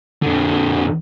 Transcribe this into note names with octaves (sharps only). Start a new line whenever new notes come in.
F2 D3